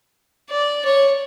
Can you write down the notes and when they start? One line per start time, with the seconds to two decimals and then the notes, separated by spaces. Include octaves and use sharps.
0.49 D5
0.85 C#5